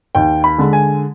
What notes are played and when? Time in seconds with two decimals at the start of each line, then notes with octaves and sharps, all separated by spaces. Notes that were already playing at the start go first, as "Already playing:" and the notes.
0.15 D#2 G5
0.44 B5
0.58 D3 G#3
0.73 G#5